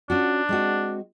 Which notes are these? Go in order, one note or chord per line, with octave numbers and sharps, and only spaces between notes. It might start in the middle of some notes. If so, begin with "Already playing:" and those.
C#4 D4 F4 F#4
G#3 C4 F#4